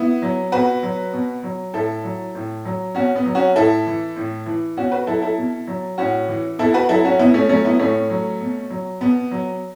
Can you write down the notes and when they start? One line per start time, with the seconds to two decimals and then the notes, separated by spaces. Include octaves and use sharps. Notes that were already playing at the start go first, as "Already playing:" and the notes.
Already playing: B3 E4
0.22 F#3
0.52 B2 F#4 B4
0.83 F#3
1.13 B2
1.43 F#3
1.73 A2 E4 A4
2.04 F#3
2.35 A2
2.65 F#3
2.95 B2 C#4 F#4
3.16 B3
3.26 F#3
3.35 C#4 F#4
3.56 A2 E4 A4
3.87 E3
4.16 A2
4.46 E3
4.77 B2 C#4 F#4
4.92 F#4 B4
5.07 F#3 E4 A4
5.22 E4 A4
5.37 B2
5.67 F#3
5.98 A2 C#4 F#4
6.28 E3
6.58 B2 E4 A4
6.74 F#4 B4
6.89 F#3 E4 A4
7.05 C#4 F#4
7.19 B2 B3 E4
7.34 A3 C#4
7.49 F#3 A3 C#4
7.65 B3 E4
7.79 A2 A3 C#4
8.10 F#3
8.41 B2
8.70 F#3
9.01 B2 B3
9.31 F#3